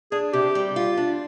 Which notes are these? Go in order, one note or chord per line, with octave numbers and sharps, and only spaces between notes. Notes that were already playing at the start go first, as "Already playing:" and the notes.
D4 G#4
C3 G4
G3
F4
D4